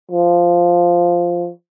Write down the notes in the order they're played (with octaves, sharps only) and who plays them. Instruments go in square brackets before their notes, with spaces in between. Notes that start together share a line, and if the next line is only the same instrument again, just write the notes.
[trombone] F3